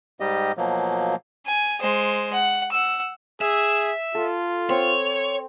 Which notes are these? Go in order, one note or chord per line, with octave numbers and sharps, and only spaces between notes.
G#2 G3 G4 D#5
B2 F3 F#3 A#3
G#5
G#3 C5
F#5
F#5 E6
G#4 E5
F4 A4
C4 C#5